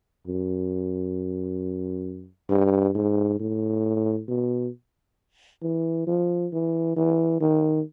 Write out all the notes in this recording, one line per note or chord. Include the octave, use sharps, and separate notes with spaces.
F#2
G2
G#2
A2
B2
E3
F3
E3
E3
D#3